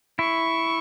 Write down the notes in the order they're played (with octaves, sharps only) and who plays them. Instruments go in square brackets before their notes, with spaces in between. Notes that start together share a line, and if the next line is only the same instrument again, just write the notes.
[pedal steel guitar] E4 [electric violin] C#6